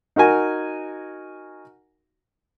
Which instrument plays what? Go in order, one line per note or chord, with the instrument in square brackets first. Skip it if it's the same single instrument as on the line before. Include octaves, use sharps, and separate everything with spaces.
[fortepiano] D#4 F#4 A#4 G#5